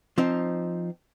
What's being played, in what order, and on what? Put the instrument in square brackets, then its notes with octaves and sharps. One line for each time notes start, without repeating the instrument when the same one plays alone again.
[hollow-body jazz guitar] F3 C4 D#4